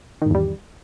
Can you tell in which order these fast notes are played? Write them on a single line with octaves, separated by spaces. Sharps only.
D#3 G#2 E2 G3